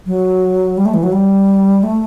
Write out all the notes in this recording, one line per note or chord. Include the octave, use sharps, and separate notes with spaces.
F#3
G3
A3
E3
F#3
G3
A3